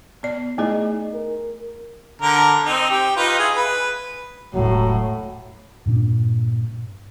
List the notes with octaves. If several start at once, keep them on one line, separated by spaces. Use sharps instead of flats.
B3 D5
A3 D#4 E4 G#4
A#4
D3 A#4
C4 D#4
G4
D#4 F4 B4
E4 G#4
B4
E1 A1 A2 F#3
G2 A#2 C4 D4